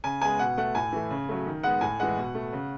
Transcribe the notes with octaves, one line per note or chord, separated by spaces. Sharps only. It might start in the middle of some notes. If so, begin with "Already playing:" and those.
C#3 G#5
G#3 B3 G#5
B2 F#5
A3 F#5
A2 G#5
E3 A3
C#3
F#3 A3
D#3
G#3 B3 F#5
A2 G#5
E3 G#3 F#5
B2
A3
C#3